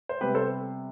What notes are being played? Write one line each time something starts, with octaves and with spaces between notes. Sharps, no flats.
C5
C3 G3 B3 G4 B4
A4 C5